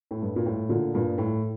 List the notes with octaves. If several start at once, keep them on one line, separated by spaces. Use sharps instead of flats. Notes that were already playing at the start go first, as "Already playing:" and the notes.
A2
G2
A#2
A2
A#2 D3
G2 A#2
A2